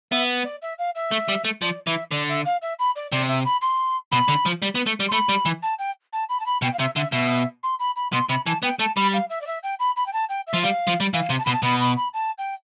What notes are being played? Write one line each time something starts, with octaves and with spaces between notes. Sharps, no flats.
B3 E5
D5
E5
F5
E5
A3
G3
A3
F3 D5
E3 E5
D3 D5
E5
F5
E5
B5
D5
C3 D5
E5
B5
C6
B2 B5
D3
F3
G3
B3
A3
G3
C6
A3 B5
G3
E3
A5
G5
A5
B5
A5
B5
B2 G5
F5
C3 E5
D3 E5
B2 E5
C6
B5
B5
B2 C6
C3 B5
E3 A5
B3 G5
A3 A5
G3 B5
F5
E5
D5
E5
G5
B5
B5
G5
A5
G5
E5
F3
G3 F5
F3
G3
E3 F5
C3
A5
B2 B5
A5
B2 B5
B5
B5
A5
G5